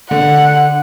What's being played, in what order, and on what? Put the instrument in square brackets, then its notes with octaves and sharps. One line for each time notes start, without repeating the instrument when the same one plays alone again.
[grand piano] D3 [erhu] F#5